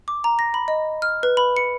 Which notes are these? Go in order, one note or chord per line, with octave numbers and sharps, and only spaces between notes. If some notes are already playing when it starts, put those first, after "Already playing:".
D6
A#5
A#6
B5
D#5
F6
B4
B5
C#7